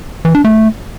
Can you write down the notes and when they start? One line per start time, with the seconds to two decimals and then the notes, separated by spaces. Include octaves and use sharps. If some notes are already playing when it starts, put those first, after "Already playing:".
0.25 E3
0.35 D4
0.44 A3